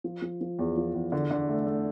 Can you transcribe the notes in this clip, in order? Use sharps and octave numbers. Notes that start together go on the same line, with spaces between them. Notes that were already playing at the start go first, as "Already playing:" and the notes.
F3
F3
F3
E2
F3
E2
D3
D3
A3
A3